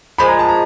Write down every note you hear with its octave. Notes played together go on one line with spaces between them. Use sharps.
A#2 F3 G#3 B5
A#5
A5
A#5